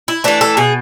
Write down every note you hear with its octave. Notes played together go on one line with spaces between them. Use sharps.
E4
E3 A3 D4
A4
B2 G#4